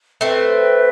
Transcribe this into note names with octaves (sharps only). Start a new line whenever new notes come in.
A3 C4 B4 E5 G5